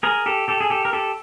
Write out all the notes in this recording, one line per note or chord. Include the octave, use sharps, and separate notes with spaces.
G#4 A#4
G4 A4
G4 A4
G#4
G4 A4
A#4
G4 A4